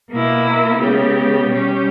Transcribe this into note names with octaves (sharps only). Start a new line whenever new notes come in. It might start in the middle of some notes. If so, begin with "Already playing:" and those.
B2 A#3 E4
C#3 G#3 B3 G4 C#5
B2 G3 C#4 G4